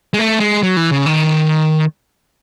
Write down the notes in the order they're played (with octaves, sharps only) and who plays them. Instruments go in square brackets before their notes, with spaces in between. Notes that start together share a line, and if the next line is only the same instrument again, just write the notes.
[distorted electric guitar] G#3
A3
G#3
F#3
E3
C#3
D#3